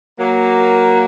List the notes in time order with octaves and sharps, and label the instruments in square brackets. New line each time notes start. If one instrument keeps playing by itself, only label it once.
[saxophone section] F#3 A#3